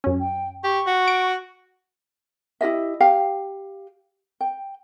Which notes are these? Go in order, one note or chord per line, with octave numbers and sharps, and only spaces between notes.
F#2 C#4
G5
G4 C#6
F#4
D7
E4 G4 D#5 E5
G4 F5 G5
G5